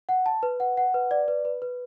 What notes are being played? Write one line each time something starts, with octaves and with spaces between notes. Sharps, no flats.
F#5
A5
B4
F#5
F#5
B4
D5
B4
B4
B4